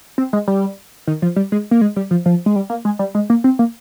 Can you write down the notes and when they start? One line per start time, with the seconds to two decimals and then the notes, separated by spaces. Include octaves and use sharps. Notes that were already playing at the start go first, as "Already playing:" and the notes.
0.18 C4
0.33 G#3
0.48 G3
1.07 D#3
1.22 F3
1.36 G3
1.52 G#3
1.71 A#3
1.81 G#3
1.96 G3
2.11 F3
2.26 F3
2.46 G#3
2.56 G3
2.70 A#3
2.85 G#3
2.99 G3
3.15 G#3
3.30 A#3
3.44 C4
3.59 A#3